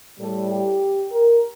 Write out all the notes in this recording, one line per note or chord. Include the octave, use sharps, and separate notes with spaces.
A2 G3 A4
G4
A#4